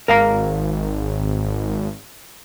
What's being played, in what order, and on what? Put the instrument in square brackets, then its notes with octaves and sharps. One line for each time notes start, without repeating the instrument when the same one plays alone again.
[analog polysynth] G#1 [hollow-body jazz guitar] A#4 F5 A#5